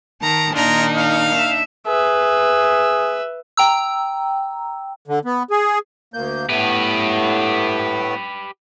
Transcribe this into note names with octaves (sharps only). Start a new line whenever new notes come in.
D#3 A5 A#5
A#2 D#3 D4 D#4 F4 A#4 A#5
F5
E5
G#4 B4 E5
G5 A#5 E6
D3
B3
G#4
D2 A#3 G6
A2 A3 B3 G4 B4